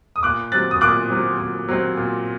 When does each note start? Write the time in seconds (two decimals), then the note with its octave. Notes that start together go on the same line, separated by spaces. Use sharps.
0.16 D#6
0.23 A#2 D6 F#6
0.52 F#3 C4 F#6 A6
0.71 D#6
0.81 A#2 D6 F#6
1.10 F#3 C4
1.39 A#2
1.69 F#3 C4
1.97 A#2